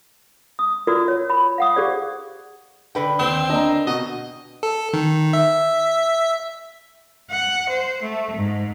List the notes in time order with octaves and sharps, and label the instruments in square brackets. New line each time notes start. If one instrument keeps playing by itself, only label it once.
[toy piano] D#6
F4 F#4 A#4 B4 D5 D#6
C#5
B5
F5 F#5 D#6
G4 G#4 C5 D5
[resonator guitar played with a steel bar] D3 B4 G5
[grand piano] D#2 E7 [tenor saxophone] C4
[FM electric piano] A#3 D4 [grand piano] D#5 A#5
[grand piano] B2 [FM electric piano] F#4 [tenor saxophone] D#5
[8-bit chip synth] A4
D#3
E5
[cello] F#5
C5
A3
G#2